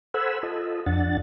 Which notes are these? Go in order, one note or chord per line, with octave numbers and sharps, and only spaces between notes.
A4 C5 F#5 G#5 B5 E6
F4 A4 D#5
F2 D4 F#5 A6